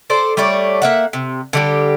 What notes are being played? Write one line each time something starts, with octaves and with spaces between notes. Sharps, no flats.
A4 C5 D5
G3 A3 C#5 D5
A#3 E5 F#5
C3
D3 G3 G4